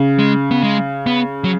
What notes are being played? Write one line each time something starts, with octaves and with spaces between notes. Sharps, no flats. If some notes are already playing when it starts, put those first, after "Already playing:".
Already playing: C#3
G#3
B3
G#3
B3
F#3